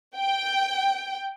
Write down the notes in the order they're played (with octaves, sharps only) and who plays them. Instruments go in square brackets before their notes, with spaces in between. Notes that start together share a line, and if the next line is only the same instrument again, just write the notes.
[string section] G5